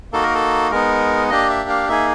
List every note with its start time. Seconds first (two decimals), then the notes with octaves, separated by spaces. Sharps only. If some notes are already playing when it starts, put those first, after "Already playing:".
0.13 A#3 D#4 F#4 A4
0.23 A#4
0.35 A4
0.71 G#3 B3 D#4 A#4
1.30 A#3 D4 G4 D#5
1.50 E5
1.69 F5
1.89 A#3 D#4 G#4 E5